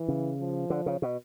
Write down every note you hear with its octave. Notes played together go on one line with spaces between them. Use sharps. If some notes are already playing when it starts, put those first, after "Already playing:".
Already playing: E3
C#3
F3
D3
C#3
B2